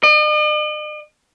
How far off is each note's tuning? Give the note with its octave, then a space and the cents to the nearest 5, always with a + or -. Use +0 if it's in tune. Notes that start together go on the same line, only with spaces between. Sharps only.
D#5 -45